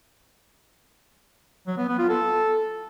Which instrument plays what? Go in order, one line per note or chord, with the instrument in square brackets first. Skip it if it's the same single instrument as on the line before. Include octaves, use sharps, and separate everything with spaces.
[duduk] F#3
B3
B3
F4
A4